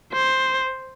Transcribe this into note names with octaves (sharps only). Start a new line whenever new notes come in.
C5